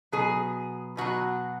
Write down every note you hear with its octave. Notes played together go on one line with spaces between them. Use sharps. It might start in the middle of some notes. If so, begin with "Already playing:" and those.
B2 F#3 G#4
B2 F#3 F#4